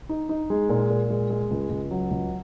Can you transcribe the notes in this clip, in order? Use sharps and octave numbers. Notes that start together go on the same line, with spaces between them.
D#4
D#4
G#3
A#2
A#2
G#3
G#3
C#2
C#2
F#3
C#2